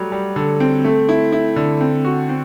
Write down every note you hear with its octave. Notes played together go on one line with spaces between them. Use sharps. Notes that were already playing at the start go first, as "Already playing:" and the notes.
Already playing: F#3 G3 A3
G3
D3
C4
A3
E4
E4
D3
C4
F#4
C4